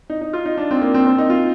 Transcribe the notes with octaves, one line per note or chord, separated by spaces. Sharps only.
D#4
D#4
F4
D#4
D4
C4
A#3
C4
C4
D#4
F4